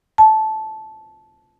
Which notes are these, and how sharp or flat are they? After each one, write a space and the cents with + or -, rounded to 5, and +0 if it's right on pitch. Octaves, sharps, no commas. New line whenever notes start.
A5 -15